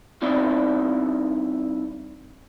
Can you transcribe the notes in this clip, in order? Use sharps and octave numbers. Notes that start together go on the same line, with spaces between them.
G2 C4 D#4 E4 D5